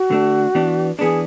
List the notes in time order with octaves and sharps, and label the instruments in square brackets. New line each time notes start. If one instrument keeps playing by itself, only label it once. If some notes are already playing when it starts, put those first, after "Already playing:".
Already playing: [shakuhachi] F#4
[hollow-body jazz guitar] D3 A3 D4
E3 B3 D4
[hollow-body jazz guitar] E3 B3 D4 [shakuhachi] G#4